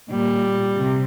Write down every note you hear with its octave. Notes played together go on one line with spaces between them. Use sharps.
A#2 G3
C3